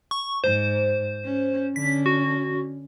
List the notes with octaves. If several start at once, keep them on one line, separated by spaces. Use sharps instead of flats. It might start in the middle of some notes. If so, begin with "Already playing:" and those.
C#6
G#2 C5
C#4
D3 C#4 B6
F#4